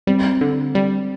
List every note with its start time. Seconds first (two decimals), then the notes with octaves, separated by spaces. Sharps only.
0.07 G3 C4
0.41 D3
0.75 G3